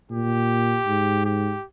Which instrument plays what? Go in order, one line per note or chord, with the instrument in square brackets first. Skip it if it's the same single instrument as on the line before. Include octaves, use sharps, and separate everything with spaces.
[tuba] A#2 [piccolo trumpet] G4
[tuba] G#2
[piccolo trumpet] G4